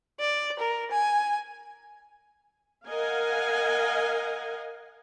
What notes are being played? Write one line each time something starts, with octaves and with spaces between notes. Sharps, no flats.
D5
A#4
G#5
A#4 D#5 F5 F#5 G#5